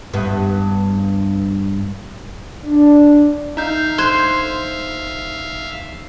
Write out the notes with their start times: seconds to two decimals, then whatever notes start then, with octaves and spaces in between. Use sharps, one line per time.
0.13 G2 B3
2.64 D4
3.57 D#4 E5 F5 A#5 G6
3.98 C5 C6 F#6 G#6